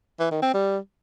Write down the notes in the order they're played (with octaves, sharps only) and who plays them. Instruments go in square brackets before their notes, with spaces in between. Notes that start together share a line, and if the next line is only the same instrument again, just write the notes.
[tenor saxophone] E3
D#3
C4
G3